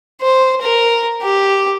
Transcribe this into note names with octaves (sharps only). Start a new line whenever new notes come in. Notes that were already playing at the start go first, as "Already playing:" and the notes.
C5
A#4
G4